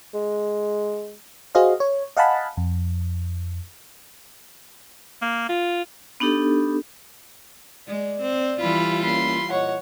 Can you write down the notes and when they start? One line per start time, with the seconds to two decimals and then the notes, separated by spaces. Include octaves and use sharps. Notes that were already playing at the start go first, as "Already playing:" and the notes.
0.14 G#3
1.55 F#4 G#4 C5 D#5 F5
1.80 C#5
2.17 D#5 F5 F#5 G#5 A5 B5
2.57 F2
5.22 A#3
5.49 F4
6.20 B3 D4 D#4 G4 A4
7.88 G#3 D5
8.21 C4
8.61 E3 G3 F4 B5
9.03 A#3 C#4 B5 C6
9.50 A#2 C#5 D#5 F#5